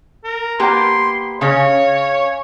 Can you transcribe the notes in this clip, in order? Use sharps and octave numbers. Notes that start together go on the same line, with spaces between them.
A#4
A#3 B3 G4 C6
C#3 C#4 C#5